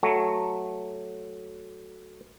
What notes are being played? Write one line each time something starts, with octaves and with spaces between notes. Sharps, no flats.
F#3 A3